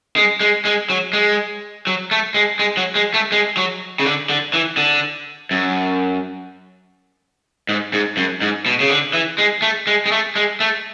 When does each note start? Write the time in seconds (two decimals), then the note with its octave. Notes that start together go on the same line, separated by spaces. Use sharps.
0.17 G#3
0.41 G#3
0.65 G#3
0.90 F#3
1.13 G#3
1.87 F#3
2.11 A3
2.35 G#3
2.59 G#3
2.77 F#3
2.95 G#3
3.14 A3
3.32 G#3
3.57 F#3
3.99 C#3
4.05 D3
4.29 D3
4.54 E3
4.77 D3
5.51 F#2
7.69 G#2
7.93 G#2
8.17 F#2
8.42 G#2
8.66 B2
8.80 C#3
8.90 D3
9.13 E3
9.38 G#3
9.62 A3
9.87 G#3
10.06 G#3
10.12 A3
10.36 G#3
10.60 A3